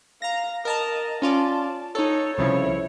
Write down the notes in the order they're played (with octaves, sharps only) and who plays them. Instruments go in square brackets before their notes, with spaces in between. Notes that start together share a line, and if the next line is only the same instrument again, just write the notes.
[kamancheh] F5 [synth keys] A#5 A#6
[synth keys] A#4 A5 A#5 [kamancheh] D#5
[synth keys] C#4 F4 D5 [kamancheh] A5
[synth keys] D#4 A4 [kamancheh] C#5
[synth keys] C2 C#3 F3 [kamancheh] E4 C#5